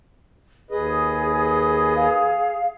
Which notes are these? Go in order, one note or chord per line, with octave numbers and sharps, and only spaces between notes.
D#2 G#4 B4 D#5
F5